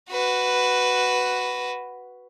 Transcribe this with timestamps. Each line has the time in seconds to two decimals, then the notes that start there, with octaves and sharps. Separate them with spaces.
0.11 F#4 B4